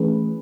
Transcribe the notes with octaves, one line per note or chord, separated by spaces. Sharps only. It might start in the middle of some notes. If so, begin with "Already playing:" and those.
Already playing: E3 A3 C#4 G#4 B4